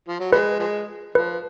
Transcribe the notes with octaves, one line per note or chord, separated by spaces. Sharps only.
F3
F#3
F3 G#3 B4
F3 G#3
F3 B4